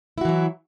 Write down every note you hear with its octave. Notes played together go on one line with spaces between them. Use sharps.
E3 F#3 E4 F#4